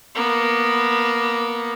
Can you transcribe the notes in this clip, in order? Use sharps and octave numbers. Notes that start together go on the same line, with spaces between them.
A#3 B3